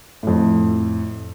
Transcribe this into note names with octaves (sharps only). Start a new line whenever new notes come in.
F2 A2